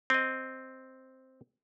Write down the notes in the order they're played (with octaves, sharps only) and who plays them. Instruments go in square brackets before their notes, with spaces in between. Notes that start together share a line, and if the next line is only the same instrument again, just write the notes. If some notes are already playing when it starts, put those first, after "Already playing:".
[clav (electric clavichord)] C4 D#5